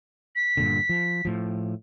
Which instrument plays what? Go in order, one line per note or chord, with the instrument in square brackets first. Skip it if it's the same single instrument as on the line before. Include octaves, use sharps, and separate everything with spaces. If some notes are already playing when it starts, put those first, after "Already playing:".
[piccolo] B6
[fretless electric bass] G2 A#2 D3
F3
A2 F3